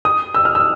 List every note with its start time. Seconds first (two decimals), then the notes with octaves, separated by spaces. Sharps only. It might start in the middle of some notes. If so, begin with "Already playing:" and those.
0.05 D#6
0.34 E6
0.45 F6
0.55 E6